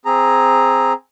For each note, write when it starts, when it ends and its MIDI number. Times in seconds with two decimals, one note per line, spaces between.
0.06 0.93 60
0.06 0.93 68
0.06 0.93 82